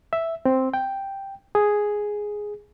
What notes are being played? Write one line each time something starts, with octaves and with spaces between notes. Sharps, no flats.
E5
C4
G5
G#4